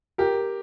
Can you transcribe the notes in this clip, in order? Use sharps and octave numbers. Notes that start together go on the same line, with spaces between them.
G4 A#4